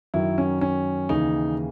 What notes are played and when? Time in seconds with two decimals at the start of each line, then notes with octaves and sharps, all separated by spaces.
0.14 F#2 D#3 F#3 E4
0.38 C#4
0.61 C#4
1.09 D#2 C#3 E3 D#4